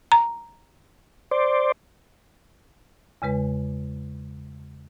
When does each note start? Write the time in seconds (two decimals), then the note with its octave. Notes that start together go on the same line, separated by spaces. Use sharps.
0.12 A#5
1.31 C5 D5
3.22 E2 C#3 G#3 B4